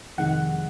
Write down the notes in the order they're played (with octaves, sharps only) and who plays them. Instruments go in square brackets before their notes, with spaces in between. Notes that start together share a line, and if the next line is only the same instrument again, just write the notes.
[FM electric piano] F2 C3 D#3 G#3 F#5